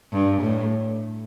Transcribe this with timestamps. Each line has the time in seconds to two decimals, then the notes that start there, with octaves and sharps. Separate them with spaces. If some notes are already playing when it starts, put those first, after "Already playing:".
0.13 G2
0.42 A2